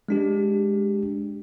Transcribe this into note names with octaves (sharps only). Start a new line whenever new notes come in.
G#3 D4 G4